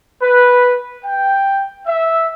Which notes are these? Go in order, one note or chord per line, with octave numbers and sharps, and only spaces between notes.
B4
G5
E5